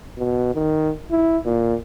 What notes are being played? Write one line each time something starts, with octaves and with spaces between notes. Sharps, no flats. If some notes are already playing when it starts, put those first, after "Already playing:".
B2
D#3
E4
A#2